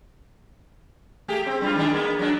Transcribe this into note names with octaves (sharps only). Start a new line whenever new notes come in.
A3 G4 G#4
C4
F#2 G3 F4
D#3 G#3 D4
A#3 B3
F#3 G#3 D4